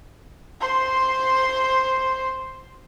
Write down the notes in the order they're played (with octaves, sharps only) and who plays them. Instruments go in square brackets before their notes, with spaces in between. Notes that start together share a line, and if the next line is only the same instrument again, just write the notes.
[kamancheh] C5 C6